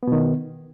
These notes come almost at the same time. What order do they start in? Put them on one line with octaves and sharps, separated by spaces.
B3 B2 D#3